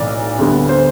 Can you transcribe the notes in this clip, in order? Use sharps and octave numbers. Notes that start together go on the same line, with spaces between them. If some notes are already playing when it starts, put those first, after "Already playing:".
Already playing: B1 A2 E3 D5
D2 D3 G3 B3
C5